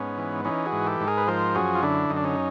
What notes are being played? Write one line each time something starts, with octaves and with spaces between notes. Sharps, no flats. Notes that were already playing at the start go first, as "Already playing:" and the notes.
Already playing: G#2 B3 C#4
E3
E3 C#4 D#4
F#4 G#4
G#2
G4 A4
G#2
G#4 A#4
B4
F3 A#4 C5
F#2 F#4 G#4
F4
D3 D4 E4
F#2 D#4
D4
C#4 D#4